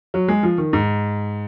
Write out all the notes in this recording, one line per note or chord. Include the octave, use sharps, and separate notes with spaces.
F#3
G#3
F3
D#3
G#2